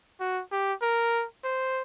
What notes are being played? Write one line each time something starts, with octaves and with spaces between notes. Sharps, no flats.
F#4
G4
A#4
C5